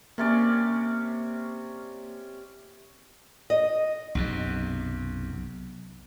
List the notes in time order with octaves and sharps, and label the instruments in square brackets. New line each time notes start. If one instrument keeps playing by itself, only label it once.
[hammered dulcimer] C3 C#4 D5 [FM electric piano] A#3
[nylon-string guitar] D#5
[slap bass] B1 F#2 C3